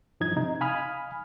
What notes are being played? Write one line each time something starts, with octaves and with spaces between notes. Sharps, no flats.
G2 F3 D#4 D#5 G#6
C3 D#4
F5 G#5 B5 D#6 F6